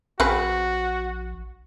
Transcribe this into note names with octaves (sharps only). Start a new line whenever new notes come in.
A#1 C4 F#4 G#4 B4